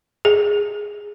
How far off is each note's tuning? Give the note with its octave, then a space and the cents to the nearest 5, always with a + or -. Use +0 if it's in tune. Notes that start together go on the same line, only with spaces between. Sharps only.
G#4 -5